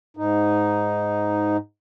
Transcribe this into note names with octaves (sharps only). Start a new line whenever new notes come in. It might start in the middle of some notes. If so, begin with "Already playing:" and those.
G#2 D#4